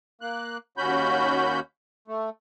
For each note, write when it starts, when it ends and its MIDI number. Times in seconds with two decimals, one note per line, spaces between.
0.21 0.57 58
0.21 0.57 90
0.77 1.60 39
0.77 1.60 61
0.77 1.60 66
0.77 1.60 83
0.77 1.60 91
2.08 2.30 57